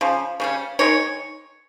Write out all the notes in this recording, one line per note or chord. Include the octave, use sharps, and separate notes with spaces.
C#3 F3
C#3 G3 C#4
D#3 G#3 D#4 C#5